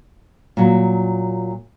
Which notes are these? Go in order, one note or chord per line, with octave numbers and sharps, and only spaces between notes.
A#2 F#3